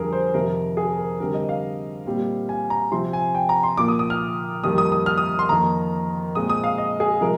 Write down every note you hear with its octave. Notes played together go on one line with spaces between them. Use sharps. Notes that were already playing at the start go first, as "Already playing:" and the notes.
Already playing: F2 D3 G3 G#4 A#4
C5
F2 C3 D#3 A#4
G#4
A#4
D3 G3 C4 A#4
D#5
F5
A#2 G3 C4
G#5
A#5
C3 F3 C4 C6
G#5
G5
A#5
C6
A#2 F3 A#3 D6
D#6
D#6
F6
F2 D#3 G3 A#3 D#6
D#6
D#6
F6
D#6
C6
F2 D#3 A#3 A#5
A#2 G#3 C4 D#6
D#6
F5
D#5
G#4
C3 F3 G#3 A#4